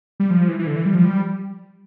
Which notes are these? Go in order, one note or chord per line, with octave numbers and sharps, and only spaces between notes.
G3
F3
E3
E3
D3
E3
G3
F3
G3